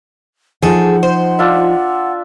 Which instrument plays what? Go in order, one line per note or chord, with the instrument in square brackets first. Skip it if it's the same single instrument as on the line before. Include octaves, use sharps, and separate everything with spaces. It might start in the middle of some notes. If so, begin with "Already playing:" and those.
[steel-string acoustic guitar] F3 D#4 [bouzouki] G#4 A4 [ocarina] F#5
[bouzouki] C5
[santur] D4 F4 E5